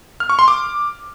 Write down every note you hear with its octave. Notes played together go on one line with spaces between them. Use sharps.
F6
C#6
C6
D6